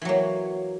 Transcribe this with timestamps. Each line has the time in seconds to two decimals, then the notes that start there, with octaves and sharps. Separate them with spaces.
0.02 E3
0.05 F#3
0.09 A#3